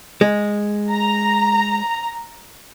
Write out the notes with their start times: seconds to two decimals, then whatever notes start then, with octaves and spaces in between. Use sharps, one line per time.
0.21 G#3
0.90 A#5